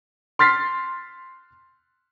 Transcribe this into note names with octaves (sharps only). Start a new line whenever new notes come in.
C6 F6 A6 B6 C7